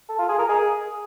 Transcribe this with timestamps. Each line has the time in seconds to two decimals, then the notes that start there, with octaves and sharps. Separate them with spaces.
0.09 A4
0.19 F4
0.29 G#4
0.39 A#4
0.49 G#4